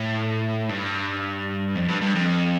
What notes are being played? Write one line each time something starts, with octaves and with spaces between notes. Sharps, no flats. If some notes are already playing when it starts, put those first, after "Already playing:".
Already playing: A2
G2
F2
G2
G2
F2